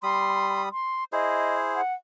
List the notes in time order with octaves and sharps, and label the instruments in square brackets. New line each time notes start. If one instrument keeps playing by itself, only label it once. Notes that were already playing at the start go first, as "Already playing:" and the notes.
[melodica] G3 B5 D#6 [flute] C6
[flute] C6
[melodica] E4 G#4 C5 [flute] D#5
[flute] F#5